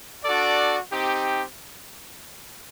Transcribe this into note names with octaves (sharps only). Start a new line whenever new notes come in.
D4 F#4 A4 D5
C4 D#4 G4